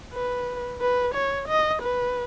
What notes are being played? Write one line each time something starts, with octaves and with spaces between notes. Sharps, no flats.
B4
B4
C#5
D#5
B4